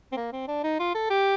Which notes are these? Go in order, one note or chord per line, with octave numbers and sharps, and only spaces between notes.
C4
A#3
C4
D4
D#4
F4
A4
G4